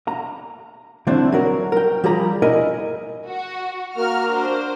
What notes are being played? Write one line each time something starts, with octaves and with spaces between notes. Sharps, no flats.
A#5
D3 A3 C4 D4 E4
F#3 F#4 A#4
A#4 G5
F3 G3 G4 G#4 A#5 B5
E4 A#4 D#5 G#5 B5
F#4
A#3 F#4 A#4 F6
D4 C5